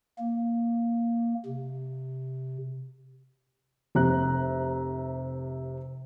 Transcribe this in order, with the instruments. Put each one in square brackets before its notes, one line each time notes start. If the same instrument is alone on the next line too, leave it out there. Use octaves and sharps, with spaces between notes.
[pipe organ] A#3
C3
[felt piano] F1 C3 A#5 F#6